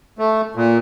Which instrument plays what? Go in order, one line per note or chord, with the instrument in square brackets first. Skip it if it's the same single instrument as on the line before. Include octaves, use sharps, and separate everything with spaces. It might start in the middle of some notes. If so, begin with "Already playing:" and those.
[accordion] A3
A#2